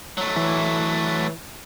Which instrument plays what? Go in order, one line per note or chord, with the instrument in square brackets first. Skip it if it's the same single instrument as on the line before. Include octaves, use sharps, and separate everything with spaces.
[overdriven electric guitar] F#3 A3
[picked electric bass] E3